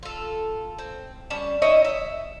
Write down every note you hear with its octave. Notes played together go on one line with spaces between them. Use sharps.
F4 A4
C4
G3 C#4 A5
D#4 E4 C#5 D#5
E5